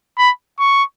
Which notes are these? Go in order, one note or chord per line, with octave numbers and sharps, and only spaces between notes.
B5
C#6